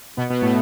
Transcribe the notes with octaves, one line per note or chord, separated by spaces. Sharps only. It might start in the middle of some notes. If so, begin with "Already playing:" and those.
B2 B3
B2 B3
A2 A3